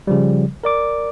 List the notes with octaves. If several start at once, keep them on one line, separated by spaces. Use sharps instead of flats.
C#3 F3 G3
A#4 D5 D6